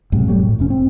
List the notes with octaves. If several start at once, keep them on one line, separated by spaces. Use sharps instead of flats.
F1 B1 G#2 C3
F#3 G3 A3
A2
F1 C#4
C4